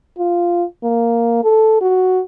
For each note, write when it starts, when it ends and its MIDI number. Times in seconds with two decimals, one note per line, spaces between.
0.18 0.64 65
0.83 1.40 58
1.44 1.80 69
1.81 2.22 66